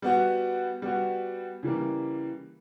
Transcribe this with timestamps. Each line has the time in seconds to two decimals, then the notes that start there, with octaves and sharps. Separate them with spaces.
0.02 G3 B3 F#4
0.82 G3 B3 F#4
1.63 C#3 E3 G3 A#3